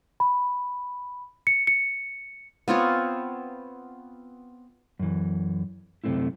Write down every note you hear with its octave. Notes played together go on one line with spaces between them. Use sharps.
B5
C#7
C#7
B3 C4 F4 C#5
F#2 E3
F#2 C3 G3 A3 C4 E4